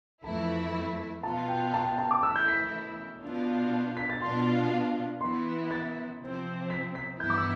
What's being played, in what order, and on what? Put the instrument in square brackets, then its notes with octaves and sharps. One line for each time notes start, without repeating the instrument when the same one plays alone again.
[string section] F2 E3 A3 E4 [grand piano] A5
[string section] B2 B3 F4 [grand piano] A5
[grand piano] G5
A5
G5
A5
D6
[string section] E3 A3 E4 [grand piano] E6
[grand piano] G6
B6
[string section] B2 B3 D4 F4
[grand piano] B6
A6
[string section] B2 B3 D4 F4 [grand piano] C6
[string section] E3 B3 E4 [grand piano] C6
[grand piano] A6
[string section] C3 F3 C4
[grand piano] B6
B6
[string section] G2 E3 B3 E4 [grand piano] G6
[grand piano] D6
E6